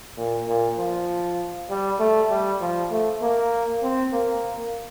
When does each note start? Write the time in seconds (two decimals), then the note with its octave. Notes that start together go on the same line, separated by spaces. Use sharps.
0.17 A#2
0.48 A#2
0.78 F3
1.70 G3
2.00 A3
2.30 G3
2.61 F3
2.91 A3
3.22 A#3
3.83 C4
4.13 A#3